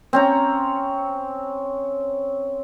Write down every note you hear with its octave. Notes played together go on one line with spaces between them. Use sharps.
C4 C#4 A#5